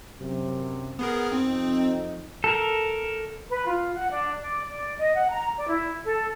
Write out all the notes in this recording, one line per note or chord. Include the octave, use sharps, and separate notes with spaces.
F#2 C3
B3 G#4 A#4
F2 C4 D#4
A4 A#4
B4
F4
F#5
D4
D5
D5
D#5
F#5
A#5
D5
E4
A4